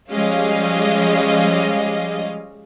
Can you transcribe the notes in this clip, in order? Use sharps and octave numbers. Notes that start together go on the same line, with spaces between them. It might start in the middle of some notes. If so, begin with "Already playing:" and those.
F3 G3 G#3 C#4 D#5 F5